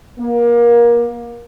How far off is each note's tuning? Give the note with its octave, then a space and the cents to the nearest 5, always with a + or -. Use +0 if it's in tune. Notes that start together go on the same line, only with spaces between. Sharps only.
A#3 +25